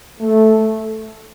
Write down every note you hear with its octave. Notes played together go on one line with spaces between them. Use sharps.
A3